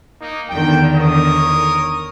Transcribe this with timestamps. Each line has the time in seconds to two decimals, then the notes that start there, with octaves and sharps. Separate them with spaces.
0.21 A#3 D#4
0.50 E2 D3 D#3 G5
0.96 A#4 C#5 D#6